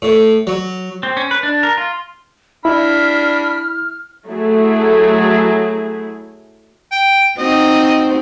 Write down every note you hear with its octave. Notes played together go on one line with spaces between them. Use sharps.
A2
F#3
C4
C#4
B4
D4
A#4
F4
D4 E4 B5 F6
F#3 A3 E4 G#4
G5
C4 D#4 F#4 D#5